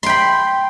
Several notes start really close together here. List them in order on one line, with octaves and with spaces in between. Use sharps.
C6 G5 B5